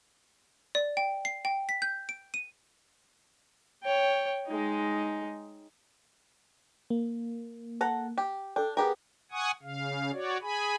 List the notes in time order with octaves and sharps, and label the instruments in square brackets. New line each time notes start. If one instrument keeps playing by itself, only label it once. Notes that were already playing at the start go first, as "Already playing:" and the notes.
[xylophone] D5
G5
C7
G5
B6
G6
D7
D#7
[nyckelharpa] C#5 G5
G#3 D#4
[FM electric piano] A#3
[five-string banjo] A4 F#5 A#5
G4
[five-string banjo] D4 [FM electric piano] A4 G5
[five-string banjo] B3 G4 A#4 [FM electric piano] G#4 B4 G5
[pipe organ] F#5 G#5 C#6 D#6
C#3 F5
F#4 C#5 D5
G#4 G#5 B5